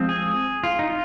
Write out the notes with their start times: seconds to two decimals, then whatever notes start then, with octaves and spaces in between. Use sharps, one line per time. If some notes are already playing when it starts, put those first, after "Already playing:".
Already playing: F3 G#3 C4
0.09 G#4
0.64 F4
0.79 D#4
0.90 F4